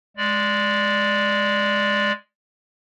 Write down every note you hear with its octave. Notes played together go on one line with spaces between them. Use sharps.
G#3 D5